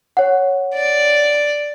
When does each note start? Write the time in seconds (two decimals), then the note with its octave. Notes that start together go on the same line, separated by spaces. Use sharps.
0.17 C#5 F#5
0.74 D5